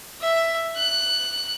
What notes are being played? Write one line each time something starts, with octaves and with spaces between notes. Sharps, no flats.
E5
F#6